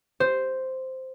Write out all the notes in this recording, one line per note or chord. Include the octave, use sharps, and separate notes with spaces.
C5